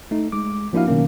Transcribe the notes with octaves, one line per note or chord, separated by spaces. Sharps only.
A3 D#4
G#3 D6
F3 A#3 D4 E4 F#4 F5
B2 D#3 F#3 A#3 C#4